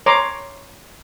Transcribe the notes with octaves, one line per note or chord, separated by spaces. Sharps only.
C#5 A#5 C6 D6